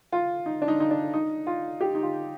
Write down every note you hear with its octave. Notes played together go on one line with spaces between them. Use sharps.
F4
D#4
D4
D#4
D#4
D4
D#4
F4
G4
D#4
F4